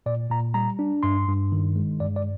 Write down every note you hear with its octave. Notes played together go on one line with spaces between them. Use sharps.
A#2 D5
A#2 A#5
G3 A#5
D4
G2 C6
G2
D#3
G#3
G2 D5
D5